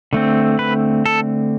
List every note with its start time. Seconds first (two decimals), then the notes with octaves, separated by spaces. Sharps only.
0.13 D3 A3 C4
0.59 B4
1.06 A4